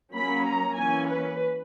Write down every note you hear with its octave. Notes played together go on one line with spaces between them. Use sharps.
F#3 A#3 C#4 B5
A#5
E3 A#3 C#4 G#5
B4